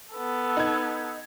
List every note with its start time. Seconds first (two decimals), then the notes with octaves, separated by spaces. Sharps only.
0.14 B3 A4
0.57 D#4 G#6